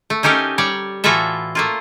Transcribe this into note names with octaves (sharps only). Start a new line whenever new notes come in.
A3
C#4 D#4 G4 A4 A#4
G3 C#5 D5
A2 E3 F4 F#4 A4 E5
A3 A#3 F4